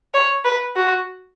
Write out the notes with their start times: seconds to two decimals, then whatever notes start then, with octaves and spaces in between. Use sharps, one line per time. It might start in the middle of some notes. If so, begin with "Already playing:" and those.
0.14 C#5
0.45 B4
0.76 F#4